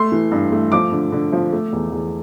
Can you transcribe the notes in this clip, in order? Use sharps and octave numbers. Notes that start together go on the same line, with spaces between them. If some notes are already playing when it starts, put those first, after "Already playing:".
Already playing: A3 C6
E3
G2
A3
F3 D6
D3
D3
F3
A3
E2
E2